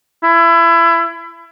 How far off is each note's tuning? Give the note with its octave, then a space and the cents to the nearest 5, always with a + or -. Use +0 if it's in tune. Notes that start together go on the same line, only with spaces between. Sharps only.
E4 +25